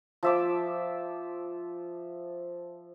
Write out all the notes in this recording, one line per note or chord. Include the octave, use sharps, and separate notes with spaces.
F3 E5 D6